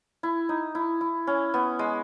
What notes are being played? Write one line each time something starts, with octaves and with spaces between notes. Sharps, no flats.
E4
D#4
E4
E4
C#4
B3
G#3